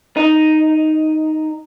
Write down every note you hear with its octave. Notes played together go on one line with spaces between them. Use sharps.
D#4